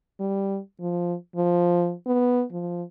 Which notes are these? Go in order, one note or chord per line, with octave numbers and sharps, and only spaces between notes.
G3
F3
F3
B3
F3